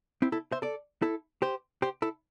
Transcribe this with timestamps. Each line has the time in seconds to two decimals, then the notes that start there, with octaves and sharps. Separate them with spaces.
0.22 C4 E4
0.32 E4 A4
0.52 C5 E5
0.62 A4 D5
1.02 E4 A4
1.42 G4 C5
1.82 G4 C5
2.02 E4 A4